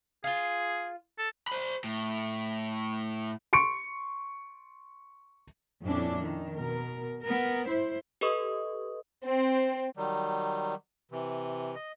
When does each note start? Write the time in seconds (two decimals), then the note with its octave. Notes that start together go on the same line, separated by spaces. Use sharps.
0.24 F4 G#4 F5
1.18 A4
1.48 C5 B5
1.84 A2
3.53 C6 C#6 C#7 D7
5.83 F2 A#2 G3 C#4 D4 E4
6.20 D#3
6.56 B2 A#4
7.23 B3 A#4
7.67 E4 C5
8.21 G4 A4 B4 D#5 C#6 D#6
9.25 C4
9.97 D#3 F#3 G3
11.11 C3 E3
11.75 D#5